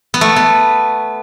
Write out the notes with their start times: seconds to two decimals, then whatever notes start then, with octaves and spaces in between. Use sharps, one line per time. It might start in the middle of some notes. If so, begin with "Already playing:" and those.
0.14 B3
0.21 A3
0.36 B3